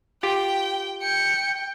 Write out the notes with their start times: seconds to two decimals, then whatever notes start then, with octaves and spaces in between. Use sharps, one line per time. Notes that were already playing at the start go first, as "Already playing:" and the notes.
0.23 F4 G4 G5
1.02 G5 C#7